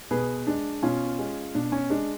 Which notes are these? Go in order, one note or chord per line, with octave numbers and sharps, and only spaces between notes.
B2 G#4 B4
G#3 D4
B2 C#4 F4
G#3
B2 D4
C#4
G#3 D4